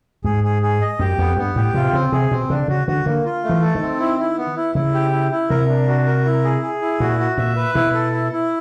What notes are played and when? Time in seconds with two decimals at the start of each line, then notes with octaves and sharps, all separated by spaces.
0.24 G#2 G#4
0.44 G#4
0.62 G#4
0.81 D#5
0.99 F#2 G4
1.18 F2 B3
1.37 G2 B3
1.56 A2 G4
1.74 C3 F4
1.93 C#3 C4
2.12 C3 G#4
2.31 B2 C4
2.49 C#3 D4
2.68 C#3 F#4
2.87 D3 F#4
3.06 D3 A#3
3.25 F4
3.44 A3
3.49 E3
3.62 A4
3.75 D#3
3.81 C4
4.00 E4
4.19 E4
4.38 B3
4.56 E4
4.75 C#3 E4
4.94 G4
5.12 E4
5.32 E4
5.50 C3 A#4
5.68 D4
5.87 F#4
6.06 A#4
6.25 E4
6.44 G#4
6.62 G#4
6.82 E4
7.00 A#2 F#4
7.19 F#4
7.38 A#2 E5
7.56 B4
7.75 B2 E4
7.94 A4
8.13 E4
8.32 E4